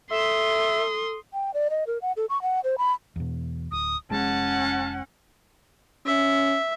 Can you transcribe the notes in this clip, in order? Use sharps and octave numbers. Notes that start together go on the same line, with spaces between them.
A4 E5 C6 D#6
G5
D5
D#5
A#4
F#5
A4
C#6
F#5
C5
B5
E2 B2
D1 D#6
F1 G#3 C#4 F#5 A5
C#4 E5